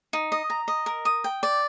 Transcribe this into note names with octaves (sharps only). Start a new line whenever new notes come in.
D#4
D#5
A#5
D#5
A#4
D#6
G5
D5